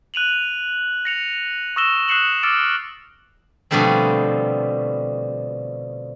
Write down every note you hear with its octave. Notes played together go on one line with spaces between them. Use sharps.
F#6 D#7 F7 F#7
A#6 C#7 F7
C#6 D#6 E6 A#6 E7 G7
D#6 F#6 C7 C#7 E7 F#7
D6 E6 F6 A6 C#7 D7
B2 D3 F3 G3 A3 C4